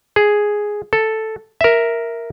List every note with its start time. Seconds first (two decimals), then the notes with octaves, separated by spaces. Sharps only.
0.16 G#4
0.93 A4
1.61 A#4 E5